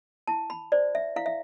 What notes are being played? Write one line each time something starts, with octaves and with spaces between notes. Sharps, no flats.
E4 A5
B5
C5 D5
E5
E4 F5
E5